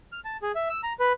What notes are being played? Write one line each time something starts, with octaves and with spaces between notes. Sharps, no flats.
F6
A5
G#4
E5
E6
A#5
B4